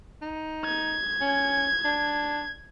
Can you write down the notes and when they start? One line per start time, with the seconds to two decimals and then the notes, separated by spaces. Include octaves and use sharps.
0.22 D#4
0.65 G#6
1.21 C#4
1.85 D4